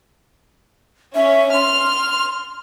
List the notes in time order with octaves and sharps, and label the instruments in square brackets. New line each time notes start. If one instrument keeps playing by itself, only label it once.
[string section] C#4 [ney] E5
[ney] C6 [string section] F6